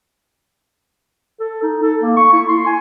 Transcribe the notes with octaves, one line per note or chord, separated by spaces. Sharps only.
A4
D#4
A4
A#3
C#6
E4
C6
G#5